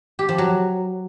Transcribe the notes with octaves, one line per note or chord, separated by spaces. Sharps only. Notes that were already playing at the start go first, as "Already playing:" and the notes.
G4
F3
F#3